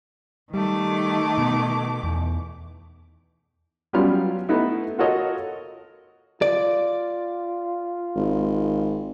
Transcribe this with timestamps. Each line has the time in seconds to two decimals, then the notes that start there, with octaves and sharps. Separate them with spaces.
0.54 D#3 G3 A3 D6
1.38 B2 B3
2.04 E2
3.93 F#3 G3 B3 C#4 F4 F6
4.49 A3 B3 D#4 E4
4.99 F4 F#4 A4 A#4 C#5 D#5
6.42 F4 D5
8.16 G#1